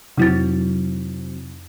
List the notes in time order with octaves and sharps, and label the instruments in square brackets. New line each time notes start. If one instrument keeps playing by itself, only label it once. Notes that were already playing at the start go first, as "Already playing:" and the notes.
[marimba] F2 E4 A6 [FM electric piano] C3 F#3 C4